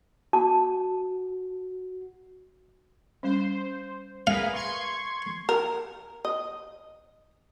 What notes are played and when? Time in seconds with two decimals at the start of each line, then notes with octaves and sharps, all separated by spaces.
0.33 F#4 A5
3.23 G3 C#4 C5
4.27 G#4 A#4 B4 F5
4.54 C6 C#6 G#6
5.49 A#4
6.25 D#5